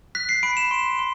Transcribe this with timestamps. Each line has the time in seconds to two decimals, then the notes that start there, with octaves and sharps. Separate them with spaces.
0.15 F#6 B6
0.29 C7
0.43 B5 D7
0.57 E7
0.71 C6
0.99 C6